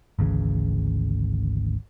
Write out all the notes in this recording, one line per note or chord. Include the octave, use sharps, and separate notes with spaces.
G#1 D2 C#3 E3